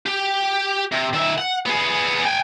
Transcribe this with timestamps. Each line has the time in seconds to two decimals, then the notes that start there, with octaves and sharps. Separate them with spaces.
0.06 G4
0.92 C3
1.13 D#3 E5
1.38 F#5
1.66 B3 G#4
2.25 G5 G#5